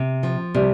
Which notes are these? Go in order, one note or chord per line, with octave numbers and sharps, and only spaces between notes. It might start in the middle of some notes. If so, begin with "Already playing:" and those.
Already playing: C3
F3
C3 G3